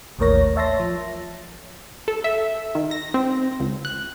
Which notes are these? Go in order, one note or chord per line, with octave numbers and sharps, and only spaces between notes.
A1 D#2 A2 A#4 C#5 A#6
C#5 E5 A5 C6 A#6
F3
A4
E5
D#3
A#6
C4
C#2
F#6